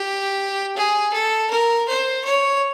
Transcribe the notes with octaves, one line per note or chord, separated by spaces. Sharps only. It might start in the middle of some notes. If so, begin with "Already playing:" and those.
Already playing: G4
G#4
A4
A#4
C5
C#5